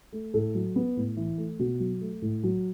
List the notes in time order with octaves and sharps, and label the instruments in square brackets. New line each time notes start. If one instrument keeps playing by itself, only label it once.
[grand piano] A3
A2 A4
F#3
B3
A2
E3
A3
B2 F#4
F#3
A3
A2
F#3